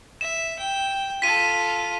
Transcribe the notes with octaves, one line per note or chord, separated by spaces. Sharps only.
E5 E7
G5
F4 A4 B6 D#7